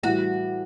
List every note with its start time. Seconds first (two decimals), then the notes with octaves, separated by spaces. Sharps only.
0.03 A2 E3 G3 F#4